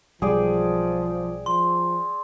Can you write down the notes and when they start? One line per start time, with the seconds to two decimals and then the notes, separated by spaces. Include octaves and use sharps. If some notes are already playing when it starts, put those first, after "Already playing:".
0.22 B1 F3 G3 G#4 D5 G5
1.46 F3 C6